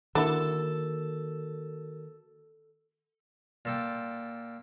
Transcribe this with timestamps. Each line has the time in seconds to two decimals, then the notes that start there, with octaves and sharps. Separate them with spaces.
0.15 D3 D#3 A#3 E4 F#4 A4 A#4 E7
3.65 A#2 A4 G5